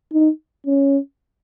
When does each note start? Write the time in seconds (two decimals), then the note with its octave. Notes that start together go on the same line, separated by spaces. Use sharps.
0.14 D#4
0.67 C#4